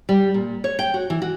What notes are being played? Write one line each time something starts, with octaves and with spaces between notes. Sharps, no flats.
G3
A#2
C#5
G5
F#4
E3
F#4